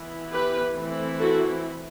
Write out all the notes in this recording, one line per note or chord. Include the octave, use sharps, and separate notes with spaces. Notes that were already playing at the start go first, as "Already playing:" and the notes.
Already playing: E3 B3 E4
G4 B4
E3 A3 C4 E4
F#4 A4